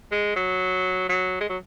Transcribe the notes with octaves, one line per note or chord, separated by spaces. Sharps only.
G#3
F#3
F#3
G#3
F#3